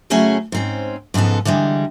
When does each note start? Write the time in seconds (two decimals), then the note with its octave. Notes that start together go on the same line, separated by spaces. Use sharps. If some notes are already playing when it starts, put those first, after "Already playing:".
0.10 C#3 F#3 A3 C#4 E4 G#4
0.52 G#2 C4 C#4
1.14 G#2 C#3 F3 B3 A4
1.45 D3 E3 G3 G#3